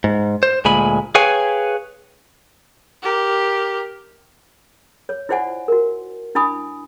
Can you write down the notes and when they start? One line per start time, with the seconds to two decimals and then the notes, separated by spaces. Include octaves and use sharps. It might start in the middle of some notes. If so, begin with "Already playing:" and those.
0.04 G#2
0.43 C5
0.65 D2 A#2 G#3 G#5 B5
1.15 G#4 B4 C#5 F5 G5 G#5
3.03 G4 A#4
5.09 C#5
5.29 E4 F4 C5 D5 F#5 G#5
5.68 F#4 A#4
6.35 D4 E4 G#5 B5 D#6